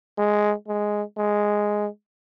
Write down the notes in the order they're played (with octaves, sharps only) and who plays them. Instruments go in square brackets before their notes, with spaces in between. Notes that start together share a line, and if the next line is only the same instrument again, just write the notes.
[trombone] G#3
G#3
G#3